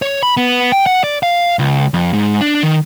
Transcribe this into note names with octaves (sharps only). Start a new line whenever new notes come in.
C#5
B5
B3
G5
F#5
D5
F5
C#2
F2
G#2
D4
D#3